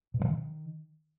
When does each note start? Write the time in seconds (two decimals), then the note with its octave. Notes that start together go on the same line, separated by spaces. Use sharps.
0.14 B2
0.20 G2
0.25 E3
0.30 D#3